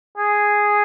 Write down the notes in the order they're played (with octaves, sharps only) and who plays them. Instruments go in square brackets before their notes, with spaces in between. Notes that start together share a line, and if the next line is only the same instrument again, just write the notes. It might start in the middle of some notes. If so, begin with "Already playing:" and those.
[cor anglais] G#4